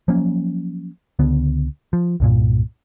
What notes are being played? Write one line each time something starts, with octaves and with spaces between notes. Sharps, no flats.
F3 F#3 A#3 C#4
C#2 D3 B3
F3
C2 G2 A#2